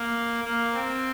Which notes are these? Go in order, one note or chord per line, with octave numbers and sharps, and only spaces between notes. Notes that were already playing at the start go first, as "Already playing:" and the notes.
Already playing: A#3
A#3
C4